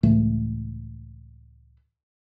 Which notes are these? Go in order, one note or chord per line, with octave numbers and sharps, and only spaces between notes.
C#2 A2 E3 A3